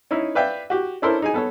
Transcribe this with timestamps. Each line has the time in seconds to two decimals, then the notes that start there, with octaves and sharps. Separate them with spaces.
0.11 C#4 D#4 E4
0.35 B4 D5 E5 F5 G5
0.70 F#4 G4
1.02 C#4 D4 E4 A4 A#4 C5
1.22 D#4 G#4 G#5
1.34 B3 A4 C#5